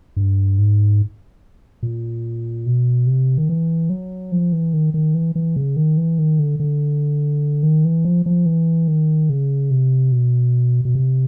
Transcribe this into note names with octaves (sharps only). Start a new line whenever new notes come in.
G2
G#2
A#2
B2
C3
D#3
E3
F#3
F3
E3
D#3
D#3
E3
E3
C#3
D#3
E3
D#3
D3
D3
D#3
E3
F3
F3
E3
D#3
C#3
C3
B2
B2
C3